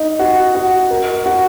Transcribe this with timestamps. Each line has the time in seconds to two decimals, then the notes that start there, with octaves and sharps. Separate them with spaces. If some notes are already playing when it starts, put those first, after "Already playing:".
Already playing: D#4
0.19 F#4
0.55 F#4
0.91 A#4
1.26 F#4